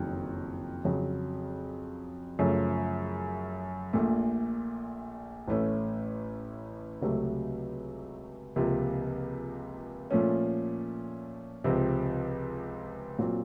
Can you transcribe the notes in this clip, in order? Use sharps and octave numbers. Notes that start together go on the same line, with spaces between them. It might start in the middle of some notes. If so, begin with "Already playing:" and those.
Already playing: F#1 F2 D#3 F#3
F2 C#3 F#3
F#2 C#3 F3 A3 C#4
A#1 A#2 A3
A1 A2 A3 C#4
C#2 C3 F#3 A3
C#2 C3 F3 A#3 F4
A#2 F3 A3 C#4
C#2 C3 F3 C4
A#2 F#3 C4 F4